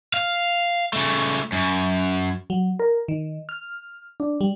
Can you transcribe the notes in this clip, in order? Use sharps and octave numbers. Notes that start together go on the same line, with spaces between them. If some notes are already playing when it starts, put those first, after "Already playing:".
F5
C#3 A3
F#2
F#3
A#4
D#3
F6
D4
G3